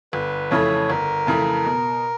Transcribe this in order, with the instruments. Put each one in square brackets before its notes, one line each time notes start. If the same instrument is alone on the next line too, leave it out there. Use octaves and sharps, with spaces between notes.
[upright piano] G1 [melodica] B4
[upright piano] F2 C#3 E3 A3 [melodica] C#5
[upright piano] G1 [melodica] A#4
[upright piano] F2 C#3 E3 A3
B2